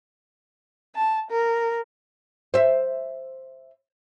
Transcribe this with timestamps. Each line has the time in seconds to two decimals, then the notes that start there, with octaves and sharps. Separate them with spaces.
0.95 A5
1.30 A#4
2.54 C5 E5